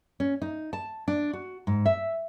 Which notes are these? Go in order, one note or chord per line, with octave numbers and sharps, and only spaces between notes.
C#4
D#4
A5
D4
F#4
G#2
E5